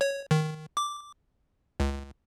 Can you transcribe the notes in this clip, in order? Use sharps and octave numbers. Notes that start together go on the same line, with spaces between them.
C#5
D#3
D6
C#2